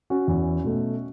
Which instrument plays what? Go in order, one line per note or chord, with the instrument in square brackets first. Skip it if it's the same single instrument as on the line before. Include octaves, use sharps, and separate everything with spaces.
[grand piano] C#4 F#4
E2
B2 A3